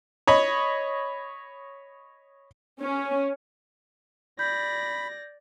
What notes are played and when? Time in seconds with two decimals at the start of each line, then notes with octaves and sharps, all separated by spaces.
0.27 C#5 D#5 B5
2.80 C#4
4.39 D5 B5 G6 A#6